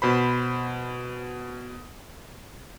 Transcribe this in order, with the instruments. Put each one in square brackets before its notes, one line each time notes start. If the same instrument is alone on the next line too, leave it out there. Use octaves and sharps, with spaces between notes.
[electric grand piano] B2 C5 B5